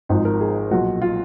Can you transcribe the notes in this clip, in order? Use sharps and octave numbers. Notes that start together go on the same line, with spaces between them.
G#1 G#2 F3 D#4
A#4
G#4
B1 A#2 F3 F#4
F4